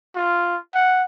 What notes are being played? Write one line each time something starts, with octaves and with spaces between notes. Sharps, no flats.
F4
F#5